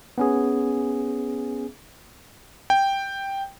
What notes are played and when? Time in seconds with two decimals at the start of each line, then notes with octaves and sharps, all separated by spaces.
0.18 B3 C#4 G#4
2.70 G5